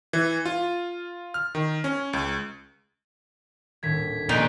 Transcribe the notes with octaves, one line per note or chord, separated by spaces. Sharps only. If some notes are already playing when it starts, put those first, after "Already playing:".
E3
F4
F6
D#3
C#4
C#2
D#1 A2 D4 G#6 B6
F1 A#2 C#3 D#4 G#4 C#6 F#6 D7